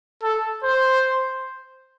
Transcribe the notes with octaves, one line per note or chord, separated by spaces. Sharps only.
A4
C5